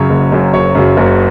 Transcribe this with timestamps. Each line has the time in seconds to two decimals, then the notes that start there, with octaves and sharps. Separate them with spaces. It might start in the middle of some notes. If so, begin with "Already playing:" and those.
Already playing: F#2 C#3 F#3 C#5
0.10 F#1
0.32 F#2 C#3 F#3
0.54 F#1 C#5
0.75 F#2 C#3 F#3
0.97 F#1